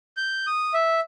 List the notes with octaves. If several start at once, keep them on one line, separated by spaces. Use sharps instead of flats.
G6
D#6
E5